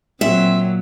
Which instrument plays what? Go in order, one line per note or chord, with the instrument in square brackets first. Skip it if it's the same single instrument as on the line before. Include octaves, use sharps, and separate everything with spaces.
[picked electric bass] A#2 [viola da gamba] F#3 [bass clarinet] C4 [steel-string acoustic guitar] E5